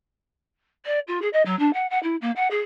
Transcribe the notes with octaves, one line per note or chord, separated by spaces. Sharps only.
D5
F4
G#4
D#5
F#3
D4
F#5
F#5
E4
A#3
F#5
G#4